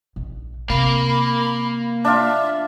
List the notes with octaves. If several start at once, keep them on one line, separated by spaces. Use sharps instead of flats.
A#1
C3 A#3 F5 B5
D4 F4 E5